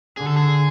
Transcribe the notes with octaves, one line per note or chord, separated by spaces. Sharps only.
D3 G#4
A4
G#4